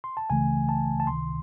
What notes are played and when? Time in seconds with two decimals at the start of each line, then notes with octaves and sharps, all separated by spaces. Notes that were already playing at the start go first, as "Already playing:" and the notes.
0.04 C6
0.17 A5
0.30 C#2 C#3 E3 A3 G#5
0.69 A5
1.00 A5
1.07 C#2 C3 D#3 C6